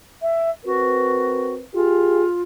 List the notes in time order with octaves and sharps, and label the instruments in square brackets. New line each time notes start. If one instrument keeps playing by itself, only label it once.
[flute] E5
[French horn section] C4 A#4 B4 [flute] F#4
[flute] F4 [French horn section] G4 G#4